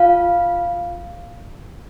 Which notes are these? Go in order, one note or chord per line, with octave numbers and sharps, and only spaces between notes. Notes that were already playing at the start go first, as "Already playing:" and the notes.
Already playing: F4 F5